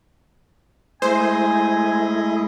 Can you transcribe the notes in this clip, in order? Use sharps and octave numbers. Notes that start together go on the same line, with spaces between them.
G#3 A3 E4 C5 D#5 G#5